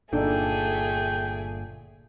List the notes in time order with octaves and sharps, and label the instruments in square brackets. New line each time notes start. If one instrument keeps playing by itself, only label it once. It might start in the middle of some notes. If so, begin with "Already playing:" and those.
[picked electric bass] G1 A#2 [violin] A3 G#4 [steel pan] D4 D#4 A4 [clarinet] G5